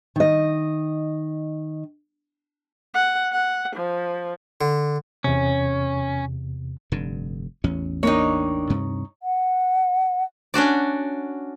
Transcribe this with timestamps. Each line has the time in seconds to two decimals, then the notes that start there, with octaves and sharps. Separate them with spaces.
0.16 D#3 D#5
2.95 F#5
3.33 F#5
3.77 F3
4.61 D3
5.24 E2 C3 C#4
6.92 F1 G2 D3
7.64 A1 E2 C#4
8.03 A#3 D4 D#4 C#5 G5
8.69 D2 G2 C3
9.23 F#5
10.54 C#4 D4 F#4 D5